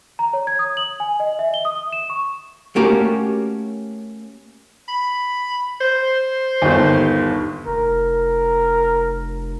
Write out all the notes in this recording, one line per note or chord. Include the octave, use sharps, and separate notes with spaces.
A#5
C#5
G#6
D#6
F#7
G#5
D#5
E5
G7
D#6
E7
C#6
A3 A#3 C#4 F#4 G4 A#4
B5
C5
G1 D#2
F1 A#4